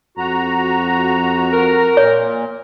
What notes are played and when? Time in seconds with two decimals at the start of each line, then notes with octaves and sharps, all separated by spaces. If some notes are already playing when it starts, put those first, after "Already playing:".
0.18 F2 F#4 A#5
1.52 A#4
1.97 A#2 C#5